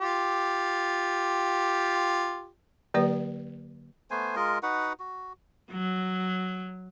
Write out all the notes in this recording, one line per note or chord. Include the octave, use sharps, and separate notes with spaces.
F4 G4
D3 F#3 A#3 G4 B4 D5
A3 B3 C5 G#5
G#3 F4 A#4 D#5
D#4 F#4 B4 F#5
F#4
F#3